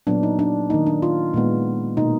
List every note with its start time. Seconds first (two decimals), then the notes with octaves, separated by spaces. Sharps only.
0.07 A#2 F#3 B3 D4
0.23 D#4
0.39 D4
0.70 D#3 A#3 D#4
0.87 D4
1.02 F4
1.34 A#2 G#3 B3
1.97 B2 A#3 D#4